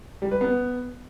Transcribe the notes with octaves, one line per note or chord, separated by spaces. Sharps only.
G3
B4
B3